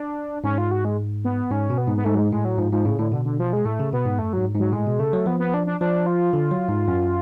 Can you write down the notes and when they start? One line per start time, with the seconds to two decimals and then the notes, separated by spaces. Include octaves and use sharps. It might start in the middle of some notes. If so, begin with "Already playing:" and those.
Already playing: D4
0.44 G#2 C#4
0.58 F4
0.71 F#4
0.85 G#3
1.24 B3
1.51 G#2 C#4
1.70 B2
1.78 B3
1.87 G#2
1.97 B3
2.05 G#2 A3
2.15 F#3
2.19 G#3
2.32 A2 G#3
2.45 F#3
2.58 G#2 F3
2.72 G#2 F3
2.85 A2 C#3
2.99 A2 D3
3.12 B2 D3
3.25 D3
3.39 F3
3.53 G#3
3.65 A2 A3
3.80 C#3
3.93 B2 B3
4.06 G#2
4.19 F#2 A3
4.33 G#2 F#3
4.55 G#2 F#3
4.72 A2 G#3
4.87 B2
4.99 C#3 A3
5.13 F#3
5.26 F3 B3
5.40 B3
5.54 D4
5.67 D4
5.81 F3 D4
6.06 F4
6.33 D3
6.51 F#3
6.69 G#2
6.88 F#2